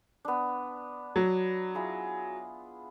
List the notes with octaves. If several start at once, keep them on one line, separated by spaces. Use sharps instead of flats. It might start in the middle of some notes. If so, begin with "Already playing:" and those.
B3 D4
F#3
E4 F4 G#4